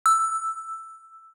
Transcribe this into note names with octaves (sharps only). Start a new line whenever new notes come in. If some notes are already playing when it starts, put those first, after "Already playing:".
E6